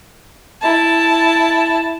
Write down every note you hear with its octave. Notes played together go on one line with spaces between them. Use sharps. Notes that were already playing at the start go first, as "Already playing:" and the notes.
E4 A5